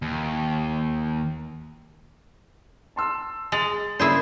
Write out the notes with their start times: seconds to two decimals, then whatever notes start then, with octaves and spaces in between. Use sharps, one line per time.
0.02 D#2
2.96 A5 C6 E6
3.52 G#3 A6 F7 F#7
3.99 C#3 A#3 D4 E4 G#4 C5